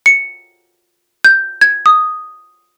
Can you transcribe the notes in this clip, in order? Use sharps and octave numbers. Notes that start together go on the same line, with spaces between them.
C#7
G6
G#6
D#6